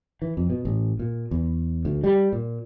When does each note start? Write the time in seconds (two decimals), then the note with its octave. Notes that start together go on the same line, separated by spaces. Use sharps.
0.22 E3
0.37 F2
0.50 B2
0.65 A1
0.99 A#2
1.31 E2
1.85 D2
2.04 G3
2.32 A#2